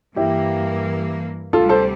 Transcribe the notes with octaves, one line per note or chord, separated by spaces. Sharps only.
G2 E3 A#3 E4 G4
D2 C3 G3 F4 A4
A4 C5